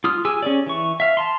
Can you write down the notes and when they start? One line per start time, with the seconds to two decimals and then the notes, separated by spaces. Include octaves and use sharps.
0.04 F4 D#6 F6
0.25 G4 G#4 G#5 E6
0.42 C#4 G#4 D5
0.67 E3 C#6
1.00 E5 F5
1.17 A5 A#5 C6